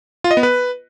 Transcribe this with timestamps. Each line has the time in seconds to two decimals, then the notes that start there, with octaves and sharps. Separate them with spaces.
0.24 F4
0.31 D#5
0.37 B3
0.43 B4